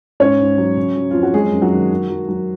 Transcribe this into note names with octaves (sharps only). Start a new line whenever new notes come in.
G#2 C#4 C#5
G#2
F#3
C#3
F#3
F2 F4
F#4
F#3 G#3 G#4
F#2
F#3 F#4
D#3
D#3
F#3
F#3